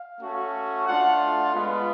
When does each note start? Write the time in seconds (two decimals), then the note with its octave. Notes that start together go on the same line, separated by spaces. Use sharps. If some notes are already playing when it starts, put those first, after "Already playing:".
Already playing: F5
0.20 A3 C#4 F#4
0.87 A3 D4 F4 F#5
1.54 G#3 B3 F4 F5